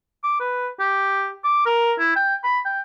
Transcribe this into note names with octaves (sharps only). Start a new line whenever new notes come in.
D6
B4
G4
D6
A#4
E4
G5
B5
G5